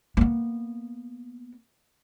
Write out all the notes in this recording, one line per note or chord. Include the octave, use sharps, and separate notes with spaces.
A#3 B3